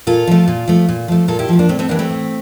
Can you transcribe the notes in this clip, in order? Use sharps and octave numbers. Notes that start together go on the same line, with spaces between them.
A#2 F4 A4
F3 A3
A#2
F3 A3
A#2
F3 A3
A#2 F4 A4
E4 G4
F3 A3
A#3 D4
A2 A3 C4
A3 C4
E3 G3 A#3 D4
A3 C4
A2